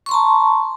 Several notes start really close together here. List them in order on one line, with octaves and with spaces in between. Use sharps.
C#6 C6 A#5 A5